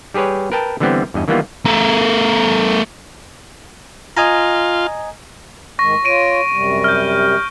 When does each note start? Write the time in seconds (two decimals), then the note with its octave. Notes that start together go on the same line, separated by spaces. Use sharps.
0.14 G3 G4 G#4 B4 C#5
0.52 A#4 B4 G5 A5
0.80 D3 E3 G3 B3 C4
1.14 E2 G2 D#5
1.28 D#3 E3 G3 A#3 B3 F4
1.66 A3 A#4
4.17 F4 D#5 G#5 A#5
5.79 G#2 D#3 G#3 C#6 A#6
6.05 F4 C#5 D7 D#7
6.52 F#2 C3 G3
6.84 F6 G6